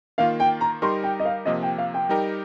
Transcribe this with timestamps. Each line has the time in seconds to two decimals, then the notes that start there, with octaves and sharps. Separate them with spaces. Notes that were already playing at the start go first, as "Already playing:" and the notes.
0.18 D#3 A#3 F4 F5
0.40 G5
0.61 A#5
0.82 G3 D#4 G4 A#4 C6
1.03 G5
1.20 D#5
1.25 F5
1.46 C3 F3 A#3 D#5
1.63 G5
1.78 F5
1.94 G5
2.09 G3 D#4 G4 A#4